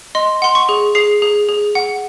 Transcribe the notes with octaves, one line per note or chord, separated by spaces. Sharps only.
D#5 C6
F#5 C6
C#6
G#4
G#4 C7
G#4
G#4
F#5